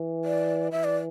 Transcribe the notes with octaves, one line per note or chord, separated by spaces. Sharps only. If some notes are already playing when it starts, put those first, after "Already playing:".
Already playing: E3
D5
E3 E5
D5